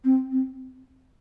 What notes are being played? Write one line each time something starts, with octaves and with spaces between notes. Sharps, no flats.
C4
C4